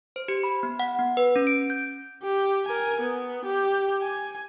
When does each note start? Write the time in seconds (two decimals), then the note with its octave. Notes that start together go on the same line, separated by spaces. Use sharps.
0.16 C5
0.28 G4
0.44 B5
0.63 B3
0.80 F#5
0.99 B3
1.17 B4
1.36 C#4
1.47 D7
1.70 G6
2.23 G4
2.66 A#4 G#5
3.01 B3
3.45 G4
4.02 G#5